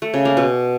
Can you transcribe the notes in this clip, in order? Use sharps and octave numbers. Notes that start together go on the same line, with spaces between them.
A3
C#3
A#3
B2